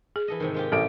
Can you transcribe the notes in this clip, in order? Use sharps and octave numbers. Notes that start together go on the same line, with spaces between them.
G#4
E3 A4 D#5
G#2 C3 D#3
G#3 F4 G4
A1 A4 D7